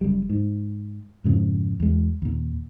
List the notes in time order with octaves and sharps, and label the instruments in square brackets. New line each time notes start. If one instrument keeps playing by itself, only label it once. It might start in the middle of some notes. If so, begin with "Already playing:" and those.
[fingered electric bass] F#1 F#2 G3
G#2
F2 G#2 C#3 F3
E2 G#3
D#2 A#2